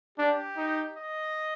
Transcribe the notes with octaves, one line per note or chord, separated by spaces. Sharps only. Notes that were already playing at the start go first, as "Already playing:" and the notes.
D4 G4
D#4
D#5